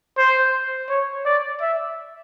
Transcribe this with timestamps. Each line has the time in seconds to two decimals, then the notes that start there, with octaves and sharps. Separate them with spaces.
0.18 C5
0.89 C#5
1.25 D5
1.61 E5